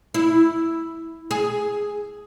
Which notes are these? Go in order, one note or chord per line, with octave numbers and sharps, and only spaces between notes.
E4
G#4